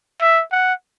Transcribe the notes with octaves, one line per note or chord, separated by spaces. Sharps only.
E5
F#5